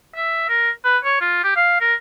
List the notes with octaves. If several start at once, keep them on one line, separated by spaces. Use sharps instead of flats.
E5
A#4
B4
C#5
F4
G4
F5
A#4